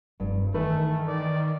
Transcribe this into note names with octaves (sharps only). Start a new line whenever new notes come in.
F1 G2
D#3 E3 A3 B4
D5